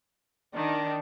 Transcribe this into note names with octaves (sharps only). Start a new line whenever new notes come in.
D#3 D4